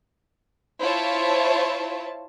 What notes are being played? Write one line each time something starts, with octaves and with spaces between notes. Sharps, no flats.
E4 F4 C5 C#5 E5 A5